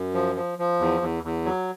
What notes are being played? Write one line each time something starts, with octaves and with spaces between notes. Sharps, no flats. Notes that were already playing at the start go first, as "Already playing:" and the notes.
Already playing: F#2
F3
F3
F3
E2
E2
E2
F#3